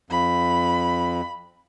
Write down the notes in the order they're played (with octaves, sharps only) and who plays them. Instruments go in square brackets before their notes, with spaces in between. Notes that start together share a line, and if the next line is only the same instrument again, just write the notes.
[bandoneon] F2 [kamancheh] B5